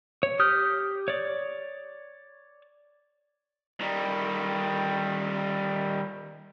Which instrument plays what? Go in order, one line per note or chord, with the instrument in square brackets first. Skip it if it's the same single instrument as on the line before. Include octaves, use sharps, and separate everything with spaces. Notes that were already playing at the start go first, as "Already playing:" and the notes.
[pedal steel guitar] C#5
G4 D#6 F6 G6
C#5 D5
[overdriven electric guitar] D#3 G3